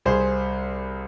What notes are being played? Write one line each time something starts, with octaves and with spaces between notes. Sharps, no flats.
C2 G#4 C5